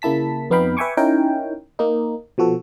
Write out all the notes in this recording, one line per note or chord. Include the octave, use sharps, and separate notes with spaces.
C#3 A#3 E4 A5 B6
F2 B3 D#4 F5 G5 B5
B4 E5 G5 G#5 C#6 D6
C#4 D#4 E4 A#4 C#5 G5
A#3 D#4
B2 F3 F#4 A4